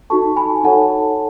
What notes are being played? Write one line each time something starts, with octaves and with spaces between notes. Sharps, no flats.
D#4 F#4 A4 A5 C#6
G#5 B5
D#4 A4 C#5 F#5 A5